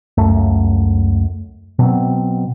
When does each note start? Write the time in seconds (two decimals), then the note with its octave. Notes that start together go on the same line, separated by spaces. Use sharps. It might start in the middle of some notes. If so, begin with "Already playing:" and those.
0.18 C#2 F#2 A3
1.79 B2 F#3 C4